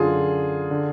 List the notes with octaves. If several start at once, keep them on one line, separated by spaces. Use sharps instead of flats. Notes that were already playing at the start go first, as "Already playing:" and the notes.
Already playing: F#2 D3 F4 G#4
D3